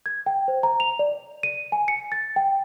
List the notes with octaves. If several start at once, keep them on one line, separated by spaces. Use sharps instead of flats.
G#6
G5
C5
A#5
F7
D5
D#7
G#5
C#7
A6
G5